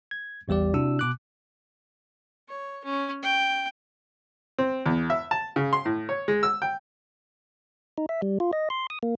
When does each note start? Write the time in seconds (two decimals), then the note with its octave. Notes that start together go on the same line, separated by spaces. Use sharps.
0.11 G#6
0.48 A1 E2 G3 G4 D5
0.74 C3 D4 E4 F#4 E6
0.99 B2 D6 F#6
2.48 C#5
2.84 C#4
3.23 G5
4.58 C4
4.86 E2
5.10 E5
5.31 A5
5.56 C#3
5.73 C6
5.85 A2
6.09 C#5
6.28 G#3
6.43 E6
6.62 G5
7.98 D#4
8.09 E5
8.22 G3
8.40 F4
8.53 D#5
8.70 C6
8.90 D#6
9.03 A#3